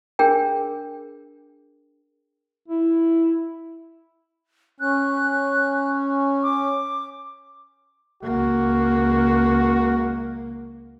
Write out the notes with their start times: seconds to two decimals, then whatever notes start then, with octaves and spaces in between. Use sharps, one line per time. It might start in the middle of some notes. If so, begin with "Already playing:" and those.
0.19 D4 G#4 A#4 G5
2.68 E4
4.80 C#4 F#6
6.43 D6
8.23 C#2 A#3 F#4